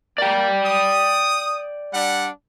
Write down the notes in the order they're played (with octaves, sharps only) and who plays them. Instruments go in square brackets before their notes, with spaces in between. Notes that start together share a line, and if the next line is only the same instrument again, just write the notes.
[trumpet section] A#3 [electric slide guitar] D5 G5
[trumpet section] D#6
G3 D4 F#5